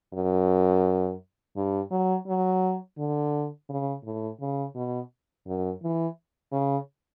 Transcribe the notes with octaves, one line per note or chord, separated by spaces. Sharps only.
F#2
G2
F#3
F#3
D3
C#3
A2
C#3
B2
F#2
E3
C#3